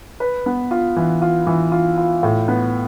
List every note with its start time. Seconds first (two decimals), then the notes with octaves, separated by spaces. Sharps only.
0.20 B4
0.46 B3
0.71 F4
0.96 E3
1.22 F4
1.47 E3
1.72 F4
1.98 F4
2.23 A2
2.48 B3